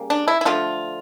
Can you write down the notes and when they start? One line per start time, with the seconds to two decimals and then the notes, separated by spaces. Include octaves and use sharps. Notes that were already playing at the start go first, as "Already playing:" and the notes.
Already playing: C#3 G3 A#3
0.10 D4
0.28 E4
0.41 E4
0.45 D3 F3 A3 F4